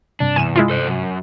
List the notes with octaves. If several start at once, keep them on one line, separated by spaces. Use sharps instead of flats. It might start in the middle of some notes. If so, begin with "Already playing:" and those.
G2 C3 D4
E2 G#5 D#7 E7
G#3 E4 F4
A4 C5
F#2